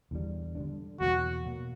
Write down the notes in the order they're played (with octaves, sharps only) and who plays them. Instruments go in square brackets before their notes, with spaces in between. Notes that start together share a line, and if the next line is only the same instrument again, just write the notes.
[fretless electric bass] E2 D3 G3
D3 G3 A#3 D4
[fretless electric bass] E2 B2 F#3 A#3 [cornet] F#4
[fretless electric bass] B2 F#3 A#3